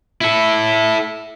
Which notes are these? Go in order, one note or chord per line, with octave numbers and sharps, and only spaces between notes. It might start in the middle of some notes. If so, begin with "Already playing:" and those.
E4 A4